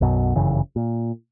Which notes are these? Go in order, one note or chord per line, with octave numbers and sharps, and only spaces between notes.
B1 F#2 B2 F#3
G1 F#2 C#3 E3
A#2